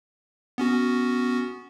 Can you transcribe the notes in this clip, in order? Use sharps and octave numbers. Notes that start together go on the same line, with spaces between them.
B3 C#4 F#4